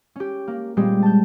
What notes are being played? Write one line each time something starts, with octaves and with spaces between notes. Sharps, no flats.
C#4 G4
A#3
A#2 G3 G#3 C4 G4
A5 G6